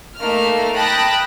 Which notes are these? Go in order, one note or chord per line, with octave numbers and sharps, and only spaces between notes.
A3 A#3 D#4 F6
G5 A5 B5 D#6 F#6 A#6